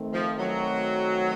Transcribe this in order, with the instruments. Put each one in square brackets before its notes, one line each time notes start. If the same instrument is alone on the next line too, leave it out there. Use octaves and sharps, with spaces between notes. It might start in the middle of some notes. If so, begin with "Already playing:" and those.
Already playing: [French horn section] D#3 A3 C4
[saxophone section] F3
F#3